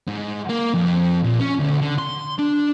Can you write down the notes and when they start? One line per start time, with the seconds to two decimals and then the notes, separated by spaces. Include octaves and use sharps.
0.08 G#2
0.50 A#3
0.74 F2
1.24 A#2
1.39 C#4
1.59 D2
1.81 D3
1.98 C6
2.38 D4